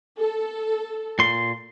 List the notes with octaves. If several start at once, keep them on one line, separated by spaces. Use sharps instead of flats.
A4
A#2 C6